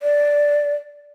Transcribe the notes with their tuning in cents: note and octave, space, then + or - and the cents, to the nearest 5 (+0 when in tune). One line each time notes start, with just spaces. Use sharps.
D5 -5